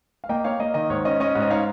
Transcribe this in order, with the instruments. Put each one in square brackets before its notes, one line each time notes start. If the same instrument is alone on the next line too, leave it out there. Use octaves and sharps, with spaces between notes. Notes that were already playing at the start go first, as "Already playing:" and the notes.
[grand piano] F5
A#3 D#5 G5
A#3 C#5 F5
A#3 D#5
D#3 D#5
G#2 C#5
C#4 D#5
C#4 D#5
G#2
D#5
D#4 C#5 F5